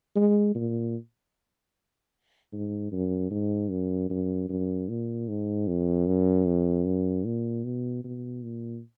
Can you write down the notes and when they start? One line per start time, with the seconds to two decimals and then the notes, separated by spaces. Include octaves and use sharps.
0.16 G#3
0.55 A#2
2.53 G#2
2.92 F#2
3.31 G#2
3.70 F#2
4.10 F#2
4.49 F#2
4.89 A#2
5.29 G#2
5.68 F2
6.07 F#2
6.47 F2
6.86 F#2
7.26 A#2
7.65 B2
8.04 B2
8.44 A#2